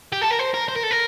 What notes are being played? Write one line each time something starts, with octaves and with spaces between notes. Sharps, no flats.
G4
A4
A#4
C5
A#4
C5
A#4
A4
A#4